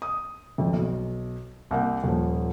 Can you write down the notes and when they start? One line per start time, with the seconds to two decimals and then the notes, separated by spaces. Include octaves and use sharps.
0.02 D#6
0.58 G#1 F2
0.73 B1
1.71 C2 A#3 G5
2.04 D#1 F3